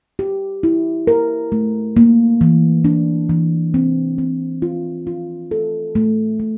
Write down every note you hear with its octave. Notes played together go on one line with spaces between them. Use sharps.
G4
E4
A#4
A3
A#3
E3
D4
E3
C4
C4
F4
F4
A4
A3
A3